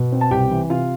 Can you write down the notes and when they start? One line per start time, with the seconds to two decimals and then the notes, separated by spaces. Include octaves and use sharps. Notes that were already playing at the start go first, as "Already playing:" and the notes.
Already playing: B2
0.12 C4
0.21 A5
0.31 C2 G4 G5
0.51 E3
0.70 C3 F4 F5